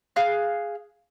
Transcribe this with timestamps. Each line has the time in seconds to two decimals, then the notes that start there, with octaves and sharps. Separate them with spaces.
0.16 G#4 F5 F6 F#6